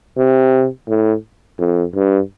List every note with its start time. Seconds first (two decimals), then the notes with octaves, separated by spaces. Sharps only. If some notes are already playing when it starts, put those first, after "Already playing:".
0.17 C3
0.88 A2
1.59 F2
1.94 G2